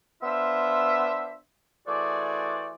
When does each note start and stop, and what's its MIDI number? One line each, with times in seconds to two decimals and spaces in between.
0.23 1.37 59
0.23 1.37 62
0.23 1.37 65
0.23 1.37 72
0.23 1.37 76
1.87 2.75 52
1.87 2.75 57
1.87 2.75 66
1.87 2.75 68
1.87 2.75 72
1.87 2.75 74